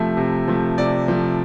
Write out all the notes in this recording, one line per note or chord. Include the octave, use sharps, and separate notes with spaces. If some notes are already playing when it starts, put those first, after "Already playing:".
Already playing: C3 F3 A3 E5
C3
F3 A3
C3 D5
F3 A3